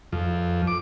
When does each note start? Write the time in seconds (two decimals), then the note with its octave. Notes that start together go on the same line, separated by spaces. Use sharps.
0.12 F2
0.67 D6